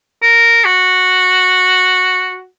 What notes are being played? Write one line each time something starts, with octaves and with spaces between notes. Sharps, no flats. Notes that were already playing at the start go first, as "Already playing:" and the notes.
A#4
F#4